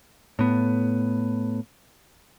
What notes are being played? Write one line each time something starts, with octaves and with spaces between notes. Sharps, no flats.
A2 B3